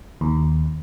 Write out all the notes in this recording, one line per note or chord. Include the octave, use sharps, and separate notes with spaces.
D#2